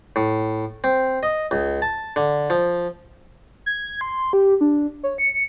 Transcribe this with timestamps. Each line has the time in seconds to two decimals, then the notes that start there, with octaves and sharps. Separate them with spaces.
0.16 A2
0.84 C4
1.23 D#5
1.51 C#2
1.82 A5
2.16 D3
2.50 F3
3.66 G#6
4.01 C6
4.33 G4
4.61 D4
5.03 C#5
5.18 C#7